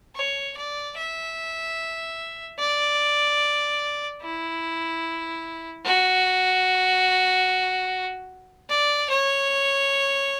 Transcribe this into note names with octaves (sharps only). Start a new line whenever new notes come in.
C#5
D5
E5
D5
E4
F#4
D5
C#5